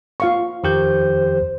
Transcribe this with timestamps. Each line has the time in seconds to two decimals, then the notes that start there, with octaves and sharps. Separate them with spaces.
0.20 F4 F5 C#6
0.64 F2 D#3 G4 C5 G6